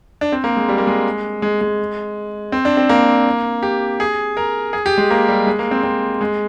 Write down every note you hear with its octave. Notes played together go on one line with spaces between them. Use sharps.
D4
C4
A#3
G#3
G3
A#3
G#3
G#3
G#3
C4
D4
C4
A#3
G4
G#4
A#4
G#4
G4
G#3
A#3
G3
G#3
A#3
C4
C4
G#3